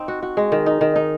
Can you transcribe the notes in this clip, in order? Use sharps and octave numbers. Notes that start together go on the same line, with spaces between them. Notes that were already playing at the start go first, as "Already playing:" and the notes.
Already playing: C4 D#4
F#4
F#4
G#3
D#3
D#4
D#3
D#4